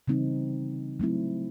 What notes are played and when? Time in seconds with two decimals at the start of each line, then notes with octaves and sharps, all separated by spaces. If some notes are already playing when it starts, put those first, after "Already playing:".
0.08 C#3 E3 G3 C4 D#4
1.00 F#3 A3 C4 E4